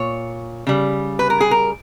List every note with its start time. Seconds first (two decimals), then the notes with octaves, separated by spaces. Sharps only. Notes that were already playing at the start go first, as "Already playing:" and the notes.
Already playing: A#2 C#5
0.67 C#3 G3
1.19 B4
1.30 A#4
1.41 G#4
1.51 A#4